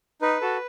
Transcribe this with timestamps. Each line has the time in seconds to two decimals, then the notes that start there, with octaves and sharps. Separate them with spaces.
0.22 D#4 B4
0.41 F#4 A4